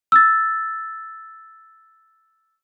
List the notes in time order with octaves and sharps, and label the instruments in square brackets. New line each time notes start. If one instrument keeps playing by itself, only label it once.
[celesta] E6 A6